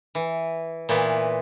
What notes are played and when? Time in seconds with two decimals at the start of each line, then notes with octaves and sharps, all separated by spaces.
0.15 E3
0.89 A#2 E3 B3